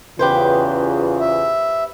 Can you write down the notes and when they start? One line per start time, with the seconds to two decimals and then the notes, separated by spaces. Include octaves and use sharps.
0.19 E2 C#3 F4 G4 B4 C5
1.20 E5